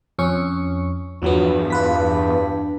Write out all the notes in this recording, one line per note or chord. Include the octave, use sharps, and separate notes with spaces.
F2 C#4 C#6
E2 G2 F3 F#3 B3
F4 B4 B6